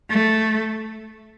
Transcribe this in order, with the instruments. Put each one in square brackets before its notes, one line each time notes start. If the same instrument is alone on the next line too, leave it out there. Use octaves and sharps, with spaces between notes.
[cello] A3